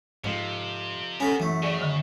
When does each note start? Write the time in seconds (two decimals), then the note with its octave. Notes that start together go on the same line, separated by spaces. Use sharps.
0.24 F2 G#2 C3
1.20 B3 C#4 A4 A#4 G#5 B5
1.40 F#2 E3 A3
1.62 C#3 G#4 D5
1.81 D3 D#3